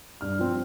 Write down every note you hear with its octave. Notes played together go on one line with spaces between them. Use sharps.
G2 F6
F3 C4